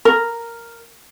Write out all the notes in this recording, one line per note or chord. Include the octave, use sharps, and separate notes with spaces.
A#4